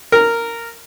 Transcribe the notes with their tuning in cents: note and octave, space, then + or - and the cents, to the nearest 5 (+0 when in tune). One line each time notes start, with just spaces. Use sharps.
A#4 -10